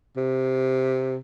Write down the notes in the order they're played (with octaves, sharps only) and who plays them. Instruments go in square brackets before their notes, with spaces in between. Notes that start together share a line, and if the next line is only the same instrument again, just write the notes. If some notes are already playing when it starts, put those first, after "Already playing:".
[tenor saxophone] C3